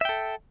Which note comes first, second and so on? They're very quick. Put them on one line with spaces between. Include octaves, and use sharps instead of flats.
E5 G5 A4